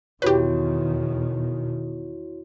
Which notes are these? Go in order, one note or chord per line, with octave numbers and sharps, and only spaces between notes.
E2 B2 D#3 E4 F#4 G4 B4 C#5